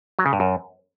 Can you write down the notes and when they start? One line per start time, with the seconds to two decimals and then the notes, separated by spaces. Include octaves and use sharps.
0.19 F#3
0.26 C#3
0.33 G2
0.40 F#2